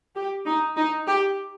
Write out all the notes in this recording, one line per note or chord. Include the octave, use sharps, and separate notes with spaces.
G4
D#4
D#4
G4